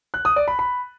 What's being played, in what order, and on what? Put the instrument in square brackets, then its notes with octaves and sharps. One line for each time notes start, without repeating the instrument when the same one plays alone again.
[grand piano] F#6
D#6
D5
B5
B5